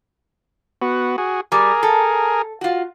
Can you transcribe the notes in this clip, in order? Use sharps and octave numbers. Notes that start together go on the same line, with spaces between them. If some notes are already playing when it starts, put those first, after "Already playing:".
B3 F#4
F#4 G#4
G3 G#4 A#4
A4
F4 F#4